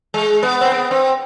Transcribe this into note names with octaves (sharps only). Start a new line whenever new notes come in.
G#3
B3
C4
B3
C4